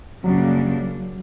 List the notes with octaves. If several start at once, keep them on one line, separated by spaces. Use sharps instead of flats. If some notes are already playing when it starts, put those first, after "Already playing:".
F#2 C#3 F#3 G3 A#3 D4